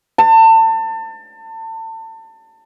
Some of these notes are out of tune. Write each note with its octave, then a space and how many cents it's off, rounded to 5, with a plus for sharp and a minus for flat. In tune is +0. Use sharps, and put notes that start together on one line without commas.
A5 +30